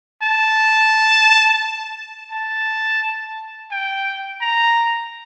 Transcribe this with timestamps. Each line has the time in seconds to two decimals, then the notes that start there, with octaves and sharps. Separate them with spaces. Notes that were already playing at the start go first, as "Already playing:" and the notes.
0.22 A5
2.32 A5
3.71 G5
4.41 A#5